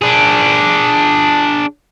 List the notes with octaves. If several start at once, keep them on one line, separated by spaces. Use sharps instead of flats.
D4 G#4